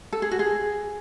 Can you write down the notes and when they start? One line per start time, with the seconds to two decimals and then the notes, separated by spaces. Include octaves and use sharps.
0.13 A4
0.22 G#4
0.31 F#4
0.39 G#4